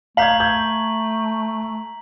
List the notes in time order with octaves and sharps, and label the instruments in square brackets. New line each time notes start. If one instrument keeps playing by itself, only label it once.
[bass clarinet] A3 [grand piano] F5 G6 G#6 [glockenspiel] A#5 B6 F#7
[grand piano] G6 G#6